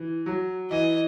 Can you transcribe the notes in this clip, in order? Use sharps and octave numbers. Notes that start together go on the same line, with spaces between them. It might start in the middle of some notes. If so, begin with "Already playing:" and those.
Already playing: E3
F#3
E3 D#5